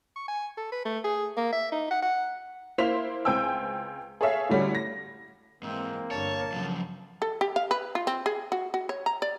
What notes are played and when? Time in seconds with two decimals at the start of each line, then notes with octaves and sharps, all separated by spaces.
0.16 C#6
0.28 G#5
0.57 A4
0.72 B4
0.85 A3
1.04 G#4
1.37 A#3
1.53 E5
1.72 D#4
1.91 F#5
2.02 F#5
2.78 A#3 E4 C5 C6 B6 F7
3.25 C#2 C4 G5 G#5 E6
4.21 G#4 A4 C#5 E5 F5
4.49 A2 D3 G3 C#4 F#4
4.75 A#6
5.63 G#2 E3 A#3 C4
6.11 G1 G2 C#5 A5
6.52 C#2 C#3 F3 F#3
7.22 A4
7.41 G4
7.56 F5
7.71 B4
7.95 F4
8.07 C4
8.26 G#4
8.52 F#4
8.74 F#4
8.89 C#5
9.06 A#5
9.22 D5